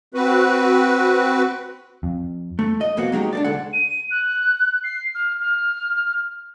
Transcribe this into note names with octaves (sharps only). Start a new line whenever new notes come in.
C4 F#4 B4
F2
A3
D#5
C2 F2 A#3 B3 F#4 F#5
F#3 G#3 D#4 G4
D4 A4 D5
C#2 G#3 A4 F#5
D#7
F#6
C7
F6
F6